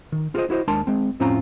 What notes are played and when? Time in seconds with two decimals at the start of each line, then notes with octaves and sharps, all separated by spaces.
0.12 D#3
0.35 F4 F#4 G#4 A4 C5 D#5
0.50 E4 F#4 C5 D#5
0.68 D#2 G#3 D4 A#4 A5 C6
0.87 G#3 C4
1.20 F2 A2 C4 C#4 F4 A#5